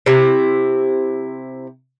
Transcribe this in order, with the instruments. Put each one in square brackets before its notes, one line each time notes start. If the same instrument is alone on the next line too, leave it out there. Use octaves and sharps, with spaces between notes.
[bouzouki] C3 E4